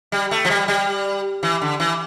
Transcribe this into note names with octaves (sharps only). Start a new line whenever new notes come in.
G3
A3
F3
G3
G3
E3
D3
E3